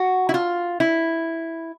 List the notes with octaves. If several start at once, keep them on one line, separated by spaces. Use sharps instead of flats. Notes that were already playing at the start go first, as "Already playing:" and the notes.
Already playing: F#4
E4
F4
E4